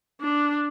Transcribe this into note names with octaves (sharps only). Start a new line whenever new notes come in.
D4